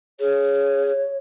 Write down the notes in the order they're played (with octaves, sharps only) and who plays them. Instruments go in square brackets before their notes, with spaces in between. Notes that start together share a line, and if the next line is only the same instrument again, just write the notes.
[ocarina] G#4 [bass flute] C#5